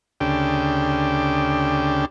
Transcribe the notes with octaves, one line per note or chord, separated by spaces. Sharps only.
D2 C#3 D4 G4 G5